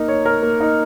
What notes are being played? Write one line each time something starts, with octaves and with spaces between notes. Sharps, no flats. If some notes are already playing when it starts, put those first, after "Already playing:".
Already playing: A#3 D#4 A#4
C#5
A#4
A#3
D#4